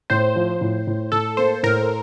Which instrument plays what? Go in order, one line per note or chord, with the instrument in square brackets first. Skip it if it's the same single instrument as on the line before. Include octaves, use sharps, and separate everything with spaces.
[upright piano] A2 [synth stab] C5
[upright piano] F3
A2
A2
[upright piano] A2 [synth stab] A4
[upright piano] A#3 [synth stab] C5
[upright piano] A2 [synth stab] A#4